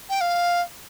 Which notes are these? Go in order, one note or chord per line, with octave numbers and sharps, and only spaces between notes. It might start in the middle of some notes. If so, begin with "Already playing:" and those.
G5
F5